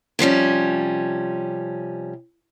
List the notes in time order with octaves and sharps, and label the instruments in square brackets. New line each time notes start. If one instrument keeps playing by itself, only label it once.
[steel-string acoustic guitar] C3 F3 G3 C#4